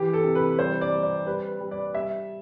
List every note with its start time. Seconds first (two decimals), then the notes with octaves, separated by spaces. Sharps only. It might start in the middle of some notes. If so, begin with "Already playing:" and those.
Already playing: E3 G4
0.13 A4
0.24 C3
0.35 B4
0.59 G3 C5
0.81 D5
0.93 G3
1.03 D5
1.26 G3 B4
1.61 G3
1.71 D5
1.94 G3 E5